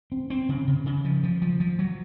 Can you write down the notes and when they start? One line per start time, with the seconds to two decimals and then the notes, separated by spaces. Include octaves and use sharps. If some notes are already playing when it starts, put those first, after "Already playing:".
0.12 C4
0.30 C4
0.49 C#3
0.68 C#3
0.86 C#3
1.05 F3
1.23 F3
1.42 F3
1.60 F3
1.79 F#3